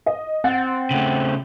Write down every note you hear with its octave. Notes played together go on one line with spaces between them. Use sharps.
D#5
C4 F#5 A6
C#3 A3